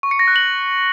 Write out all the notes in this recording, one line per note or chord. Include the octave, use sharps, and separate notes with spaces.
C#6
C#7
A#6
F#6
F#7